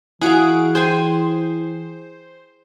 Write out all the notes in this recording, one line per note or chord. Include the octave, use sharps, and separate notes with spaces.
E3 E4 F#4 G#4 F5 F#5 D7
G#4 C5 G5 G#5